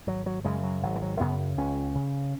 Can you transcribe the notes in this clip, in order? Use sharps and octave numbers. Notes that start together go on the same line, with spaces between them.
G#1 F#3
F#3
F#2 C#3 G#3
F#3
G#1 F#3
E3
F#3
F#2 C#3 B3
C#2 C#4
C#3